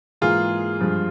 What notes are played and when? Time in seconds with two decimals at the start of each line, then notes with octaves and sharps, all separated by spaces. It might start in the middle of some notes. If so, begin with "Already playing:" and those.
0.21 G#2 E3 A#3 F4 G#4
0.80 G2 F3 G#3